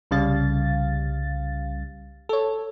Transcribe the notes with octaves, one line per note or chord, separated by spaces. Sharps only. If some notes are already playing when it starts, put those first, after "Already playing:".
C2 C#3 G3 F5 A6
A4 C#5